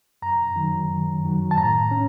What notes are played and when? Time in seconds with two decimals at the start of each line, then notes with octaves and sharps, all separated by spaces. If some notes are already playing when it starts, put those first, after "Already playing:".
0.22 F#2 A#5
0.56 D#3 F#3
0.90 F#2
1.24 D#3 F#3
1.51 A5
1.57 A2 A#5
1.91 C#4